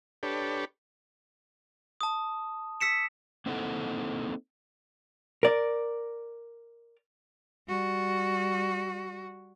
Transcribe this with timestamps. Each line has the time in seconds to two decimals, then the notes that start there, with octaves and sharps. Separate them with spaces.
0.23 D4 G4 A4 B4 C#5
2.01 A5 D#6
2.80 E6 B6 C#7 E7
3.46 A#3 C4 D#4 E4 A4 F#5
5.43 A#4 D5
7.68 G3 F#4